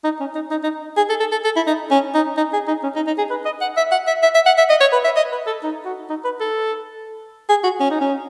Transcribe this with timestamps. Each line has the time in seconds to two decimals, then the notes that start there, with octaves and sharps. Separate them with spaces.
0.04 D#4
0.20 C#4
0.35 D#4
0.51 D#4
0.63 D#4
0.97 G#4
1.10 A4
1.20 A4
1.32 A4
1.44 A4
1.56 E4
1.67 D#4
1.91 C#4
2.14 D#4
2.37 D#4
2.53 G#4
2.67 D#4
2.83 C#4
2.96 D#4
3.07 D#4
3.18 G#4
3.30 B4
3.45 D#5
3.61 F#5
3.77 E5
3.92 F#5
4.07 E5
4.23 E5
4.35 E5
4.46 F#5
4.58 E5
4.70 D#5
4.81 C#5
4.92 B4
5.05 E5
5.16 D#5
5.32 B4
5.47 A4
5.63 D#4
5.85 F#4
6.10 D#4
6.25 B4
6.40 A4
7.49 G#4
7.64 F#4
7.80 C#4
7.91 D#4
8.01 C#4